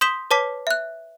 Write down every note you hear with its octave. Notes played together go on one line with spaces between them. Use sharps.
C6 D#6 G6 B6 E7 G7
B4 C#5 A5 D6 B6
E5 F#6